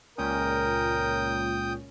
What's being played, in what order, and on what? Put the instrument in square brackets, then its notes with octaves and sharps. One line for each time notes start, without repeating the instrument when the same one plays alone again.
[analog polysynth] C#2 A#2 C#4 [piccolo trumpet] A#4 [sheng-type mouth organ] G5 D#6